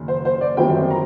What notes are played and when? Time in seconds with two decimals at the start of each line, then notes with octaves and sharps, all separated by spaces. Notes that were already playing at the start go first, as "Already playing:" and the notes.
Already playing: F#1 D#3
0.08 C5
0.25 C5
0.41 D5
0.57 G1 F#2 D#3 G3 C4 G5
0.91 A#5